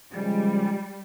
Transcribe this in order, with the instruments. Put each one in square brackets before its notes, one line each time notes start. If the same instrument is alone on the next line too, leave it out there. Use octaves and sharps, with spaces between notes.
[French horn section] C#3 F3 G#3 [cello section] G3